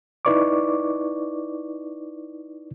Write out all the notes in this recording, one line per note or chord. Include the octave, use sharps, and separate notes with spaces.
D#4 E4 B4 D5 C#6 D6